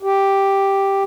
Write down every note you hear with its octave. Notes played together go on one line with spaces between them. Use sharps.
G4